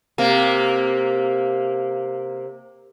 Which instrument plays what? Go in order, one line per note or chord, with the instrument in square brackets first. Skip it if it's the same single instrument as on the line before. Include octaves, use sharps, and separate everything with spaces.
[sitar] C3 A#3